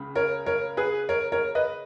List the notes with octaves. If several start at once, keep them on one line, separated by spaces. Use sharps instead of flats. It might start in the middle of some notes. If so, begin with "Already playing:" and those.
Already playing: C#2 C#3
A#4 C#5
A#4 C#5
G#4 B4
A#4 C#5
A#4 C#5
B4 D#5